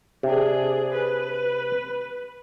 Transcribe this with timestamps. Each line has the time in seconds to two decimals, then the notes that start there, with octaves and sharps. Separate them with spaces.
0.23 C3 D4 G#4
0.93 B4